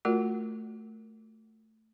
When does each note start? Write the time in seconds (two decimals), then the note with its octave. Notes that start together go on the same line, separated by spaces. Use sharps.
0.05 A3 F4 F#4 A#4 D5